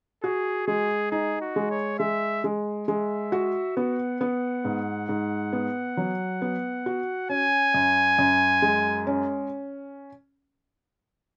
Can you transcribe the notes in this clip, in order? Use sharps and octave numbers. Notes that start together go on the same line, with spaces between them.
F#4 G#4
G#3 G#4
D#4 G#4
F#4
G#3
C#5
G#3 E5
G#3
G#3 E5
F#4
B3 F#5
B3
G#2
G#2
B3
F#3
B3
F#4
C#4 G#5
F#2
F#2
G#3
C#4